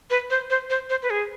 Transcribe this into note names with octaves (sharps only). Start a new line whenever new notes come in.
B4
C5
C5
C5
C5
B4
G#4